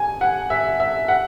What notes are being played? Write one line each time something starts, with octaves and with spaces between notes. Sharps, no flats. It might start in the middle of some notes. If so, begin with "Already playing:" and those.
Already playing: G#5
F#5
E5
E5
F#5